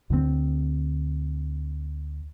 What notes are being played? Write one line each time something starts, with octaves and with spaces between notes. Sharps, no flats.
D2 D3 D#3 C4